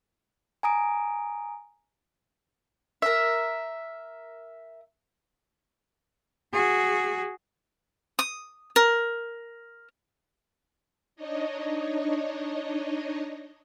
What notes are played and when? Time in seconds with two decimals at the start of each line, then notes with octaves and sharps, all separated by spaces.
0.63 G#5 A#5 D#6 D7
3.02 A#4 E5
6.53 F#4 G#4
8.19 D#6
8.76 A#4
11.16 D4 D#4 C#5 D#5